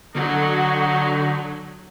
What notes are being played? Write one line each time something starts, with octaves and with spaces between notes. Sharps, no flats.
D3 F#3 D#4 F#4